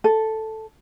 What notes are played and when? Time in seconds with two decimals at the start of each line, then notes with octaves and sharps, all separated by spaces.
0.04 A4